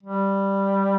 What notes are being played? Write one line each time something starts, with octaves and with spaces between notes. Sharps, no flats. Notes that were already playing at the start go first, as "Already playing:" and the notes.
G3